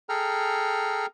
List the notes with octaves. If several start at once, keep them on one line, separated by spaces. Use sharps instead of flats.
G#4 A4 G5 A#5 F6